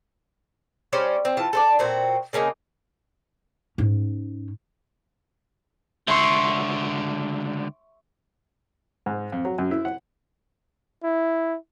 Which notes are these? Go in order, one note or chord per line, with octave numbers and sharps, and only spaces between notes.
G3 C#4 C5 D5
C4
E3 F4 A5
A4 C5 D5
A#2 C4 F#4
C#3 A#3 C#4 D#4
G#2 C#4
C#2 D3 E5 C6 C#6
G#2
F2
F#3
F#2
E4
F#5
E4